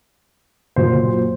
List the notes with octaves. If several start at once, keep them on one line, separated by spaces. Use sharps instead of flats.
A#2 F#3 C5